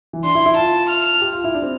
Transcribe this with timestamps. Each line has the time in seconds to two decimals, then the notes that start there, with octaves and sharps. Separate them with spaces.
0.13 E3
0.24 D4 C6
0.35 E4
0.46 E4
0.57 F4 A5
0.89 F6
1.21 G4
1.33 F4
1.44 E4
1.55 D4
1.62 C4